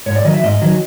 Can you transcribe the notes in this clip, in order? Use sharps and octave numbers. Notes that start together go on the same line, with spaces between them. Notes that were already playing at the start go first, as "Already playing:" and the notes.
G#2 C#5
D5
D#3 F#3 D#5
E5
G#2 D#5
D#3 F#3